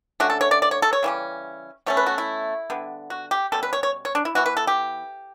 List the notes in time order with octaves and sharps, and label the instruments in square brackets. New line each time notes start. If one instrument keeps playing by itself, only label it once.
[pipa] D3 A3 C#4 F#4
A4
C#5
D5
D5
C#5
A4
C#5
C#3 E3 G3 C#4
B2 A3 C#4 C#5
B4
F#4
E4
D3 G3 B3
F#4
G4
B2 G3 C#4 A4
B4
C#5
C#5
C#5
D4
E4
E3 B3 F#4
B4
A4
G4